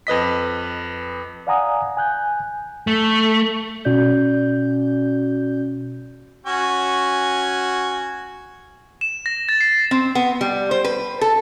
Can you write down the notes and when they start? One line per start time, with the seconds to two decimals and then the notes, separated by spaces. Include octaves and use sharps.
0.07 F2 B4 D#5 B6
1.47 D5 F5 F#5 G#5 A#5 D#6
1.97 G#5 F#6 G6
2.87 A3
3.85 B2 C#4 F#4 D5 G6
6.46 C#4 F#4 G#5
9.01 E7
9.26 A#6
9.49 A6
9.61 C7
9.91 C4
10.15 B3
10.41 G3
10.71 C5
10.84 B4
11.21 A4